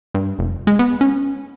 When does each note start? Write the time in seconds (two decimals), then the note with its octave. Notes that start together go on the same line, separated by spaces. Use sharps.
0.14 G2
0.39 F1
0.67 G#3
0.79 B3
1.01 C#4